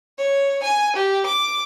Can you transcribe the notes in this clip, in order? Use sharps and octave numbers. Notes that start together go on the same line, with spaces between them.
C#5
G#5
G4
D6